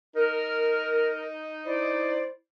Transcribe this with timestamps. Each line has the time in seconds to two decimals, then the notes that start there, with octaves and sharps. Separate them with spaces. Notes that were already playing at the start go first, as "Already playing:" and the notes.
0.15 D#4 A#4
1.66 E4 C5 D5